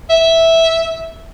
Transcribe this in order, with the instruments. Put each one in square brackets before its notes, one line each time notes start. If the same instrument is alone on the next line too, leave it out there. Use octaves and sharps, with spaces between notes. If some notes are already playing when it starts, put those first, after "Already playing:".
[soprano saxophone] E5